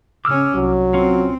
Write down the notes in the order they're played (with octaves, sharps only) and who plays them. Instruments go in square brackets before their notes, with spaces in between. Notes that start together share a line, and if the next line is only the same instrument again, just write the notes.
[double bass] C#3 C#4 [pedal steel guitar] D6 E6 F6
[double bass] C2 [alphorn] F#3
[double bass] C4 [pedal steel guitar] C#4 F4